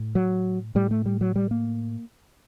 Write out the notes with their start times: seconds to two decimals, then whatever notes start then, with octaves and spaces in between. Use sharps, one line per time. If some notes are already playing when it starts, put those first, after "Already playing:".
Already playing: A2
0.15 F#3
0.75 A2 G3
0.91 A3
1.06 G3
1.21 F#3
1.36 G3
1.51 A#3